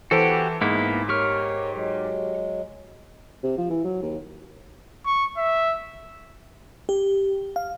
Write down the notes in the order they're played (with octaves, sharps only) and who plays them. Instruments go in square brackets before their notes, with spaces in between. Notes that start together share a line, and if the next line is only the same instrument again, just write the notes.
[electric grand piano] E3 A4 C5 [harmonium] B3 [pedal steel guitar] F#4 G4
[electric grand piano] G#2 [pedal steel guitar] A#3 B3 E4 [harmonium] G#4
[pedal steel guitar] G4 C#6 F6 [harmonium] A#4 C#5
[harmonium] F#3 G#3
[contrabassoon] C3
F3
E3
F#3
D#2
[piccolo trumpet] C#6
E5
[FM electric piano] G4
F5